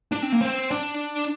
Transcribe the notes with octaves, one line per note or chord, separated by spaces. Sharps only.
D4
C4
A#3
C4
D4